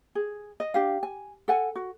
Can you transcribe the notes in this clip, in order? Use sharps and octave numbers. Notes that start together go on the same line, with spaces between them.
G#4
D#5
D4 G4 F5
G#5
A4 F#5 G#5
F#4